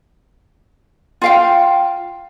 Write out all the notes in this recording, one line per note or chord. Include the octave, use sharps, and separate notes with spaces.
F4 F5 G5